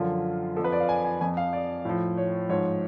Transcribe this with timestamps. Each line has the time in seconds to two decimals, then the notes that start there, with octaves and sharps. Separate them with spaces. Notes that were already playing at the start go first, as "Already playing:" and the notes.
Already playing: F#2 D3 F3 F4
0.56 F3 A4
0.59 F2
0.64 B4
0.72 D5
0.80 F5
0.89 G#5
1.05 G#5
1.21 F2 F3 G#5
1.37 F5
1.53 D5
1.85 A2 F3
2.17 C#5
2.49 G#2 F3 C#5